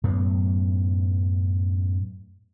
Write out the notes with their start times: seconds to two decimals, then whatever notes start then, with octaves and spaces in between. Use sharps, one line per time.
0.04 F#2 A2 C3 B3